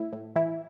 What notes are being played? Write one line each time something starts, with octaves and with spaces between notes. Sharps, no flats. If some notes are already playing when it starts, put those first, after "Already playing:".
Already playing: A2 E4
A2
E3 E4